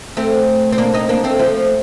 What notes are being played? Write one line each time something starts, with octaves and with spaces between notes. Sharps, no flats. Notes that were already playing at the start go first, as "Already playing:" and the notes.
A3 C4
C4
A#3 D4
C4 D#4
A#3 D4
A3 C4
F3 A3